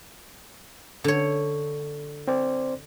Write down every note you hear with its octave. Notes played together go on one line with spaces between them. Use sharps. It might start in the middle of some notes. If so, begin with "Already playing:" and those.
D3 C#5
C4 C5 D5